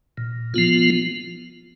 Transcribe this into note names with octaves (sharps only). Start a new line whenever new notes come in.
A#2
F3 B3 F4